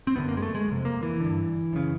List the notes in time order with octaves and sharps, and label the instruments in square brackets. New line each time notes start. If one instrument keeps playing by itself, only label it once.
[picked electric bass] C4
F#2 D3 B3
A#3
G#3
A3
G#3
F2 C3
A#3
E3
G2 D3
F#2 C#3